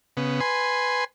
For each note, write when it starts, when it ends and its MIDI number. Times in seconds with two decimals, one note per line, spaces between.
0.17 0.40 49
0.17 0.40 59
0.40 1.04 71
0.40 1.04 80
0.40 1.04 84